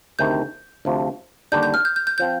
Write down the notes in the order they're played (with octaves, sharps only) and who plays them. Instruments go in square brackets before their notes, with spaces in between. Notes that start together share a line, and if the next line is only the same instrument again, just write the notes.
[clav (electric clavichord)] D2 C3 D#3 [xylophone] G6
[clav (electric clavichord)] D2 C3 F3
[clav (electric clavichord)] D#2 D3 G3 D4 [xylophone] G6
[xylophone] G6
F6
G6
G6
G6
[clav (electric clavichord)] F3 C4 [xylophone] G6